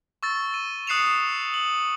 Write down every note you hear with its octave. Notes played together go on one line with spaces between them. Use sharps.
C#6 E6 A6
D#7
D#6 F#6 C7 C#7 E7 F7
F#7